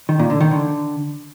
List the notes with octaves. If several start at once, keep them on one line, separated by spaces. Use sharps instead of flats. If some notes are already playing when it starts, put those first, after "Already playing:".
D#3
A#2
D3
D#3
D3